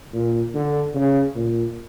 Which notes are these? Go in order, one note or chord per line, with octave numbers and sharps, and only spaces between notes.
A#2
D3
C#3
A#2